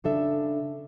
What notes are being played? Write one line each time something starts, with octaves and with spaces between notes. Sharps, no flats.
C#3 D4 A4 E5